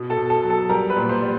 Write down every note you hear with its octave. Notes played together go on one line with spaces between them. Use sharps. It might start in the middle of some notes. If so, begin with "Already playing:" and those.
Already playing: B2
A4 A5
B2
A4 A5
F#3
A4 A5
G3 A#4 A#5
B4 B5
A#2
C5 C6
G3